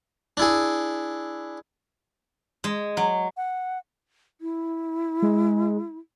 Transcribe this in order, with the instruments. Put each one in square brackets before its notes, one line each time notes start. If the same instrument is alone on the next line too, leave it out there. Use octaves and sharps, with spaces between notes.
[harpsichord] D4 E4 G#4
[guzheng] G#3
F#3
[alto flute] F#5
[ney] E4
[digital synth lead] G#3